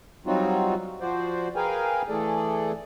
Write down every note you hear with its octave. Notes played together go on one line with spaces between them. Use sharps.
F#3 G3 C4 D#4 F4 F#4
F3 F#4 C5 D5
G#4 A#4 B4 F5 G5 G#5
E3 A3 G#4 A4 D5